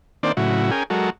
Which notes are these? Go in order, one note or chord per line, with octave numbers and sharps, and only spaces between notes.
D#3 A#3 C4 D4 C5 D5
A2 C#3 F#3 E4 F#4
C#4 G#4 A#4 G5 G#5
F#3 G#3 F#4 A4 A#4